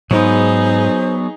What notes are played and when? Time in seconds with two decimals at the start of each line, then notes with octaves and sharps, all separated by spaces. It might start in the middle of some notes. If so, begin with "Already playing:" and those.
0.11 G#2 F#3 B3 D#4 G#4 C5